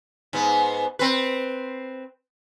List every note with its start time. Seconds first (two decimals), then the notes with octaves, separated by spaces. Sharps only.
0.33 G#2 B3
0.99 C4 B4